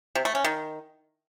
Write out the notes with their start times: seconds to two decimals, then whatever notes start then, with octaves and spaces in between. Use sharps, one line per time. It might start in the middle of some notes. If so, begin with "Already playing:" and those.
0.15 C3
0.25 A3
0.35 C#4
0.44 D#3